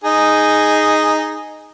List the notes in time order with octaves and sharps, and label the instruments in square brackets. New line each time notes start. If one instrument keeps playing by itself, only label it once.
[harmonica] D#4 G#4